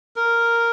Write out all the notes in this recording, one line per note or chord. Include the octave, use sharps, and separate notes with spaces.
A#4